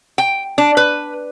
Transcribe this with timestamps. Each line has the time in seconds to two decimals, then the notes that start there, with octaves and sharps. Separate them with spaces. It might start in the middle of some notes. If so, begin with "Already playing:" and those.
0.18 G5
0.58 D4
0.77 B4